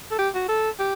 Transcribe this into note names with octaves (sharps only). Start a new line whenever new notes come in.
A4
G4
F#4
A4
G4